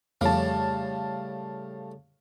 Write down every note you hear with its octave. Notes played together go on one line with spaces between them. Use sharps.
F2 A2 C#3 G3 F5 A5